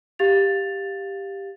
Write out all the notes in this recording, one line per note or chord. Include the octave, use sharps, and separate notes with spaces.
G4 F5 A6 F7